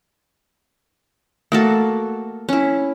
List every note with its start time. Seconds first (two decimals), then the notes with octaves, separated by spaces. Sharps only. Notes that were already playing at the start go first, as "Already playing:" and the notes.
1.52 A3 A#3 F#4 A4
2.49 C#4 E4